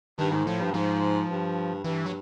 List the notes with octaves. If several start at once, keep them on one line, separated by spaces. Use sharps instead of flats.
G2 D#3
G#2
A2 F3
G2
G#2 F3
G2
G2 E3
F#3